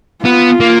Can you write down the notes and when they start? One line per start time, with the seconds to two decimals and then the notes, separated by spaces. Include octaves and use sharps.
0.25 B3 F4
0.60 A#3